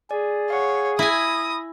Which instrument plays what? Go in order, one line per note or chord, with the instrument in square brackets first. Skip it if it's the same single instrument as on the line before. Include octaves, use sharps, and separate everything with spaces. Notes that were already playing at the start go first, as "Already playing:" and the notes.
[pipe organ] G#4 [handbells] D5
[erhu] C#5 [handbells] F5 F#5
[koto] E4 G#5 [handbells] B5 A#6 [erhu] D#6